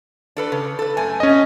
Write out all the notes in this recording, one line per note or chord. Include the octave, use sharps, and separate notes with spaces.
D4 A4 B4
C#3
A4 B4
F#2 A3 G#5
C#4 D#5